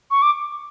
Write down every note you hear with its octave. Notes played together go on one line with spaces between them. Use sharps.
C#6
D6